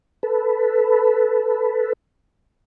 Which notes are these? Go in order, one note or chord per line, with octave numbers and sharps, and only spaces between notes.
A4 B4